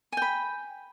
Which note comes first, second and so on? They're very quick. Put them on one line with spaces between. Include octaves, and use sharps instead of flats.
G#5 G5 B5